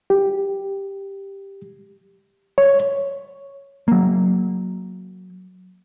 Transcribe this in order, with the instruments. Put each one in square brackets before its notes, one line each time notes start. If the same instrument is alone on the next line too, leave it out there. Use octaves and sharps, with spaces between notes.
[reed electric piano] G4
C#5
[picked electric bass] F#3 A#3